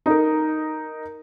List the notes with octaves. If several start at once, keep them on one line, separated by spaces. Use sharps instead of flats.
D#4 A#4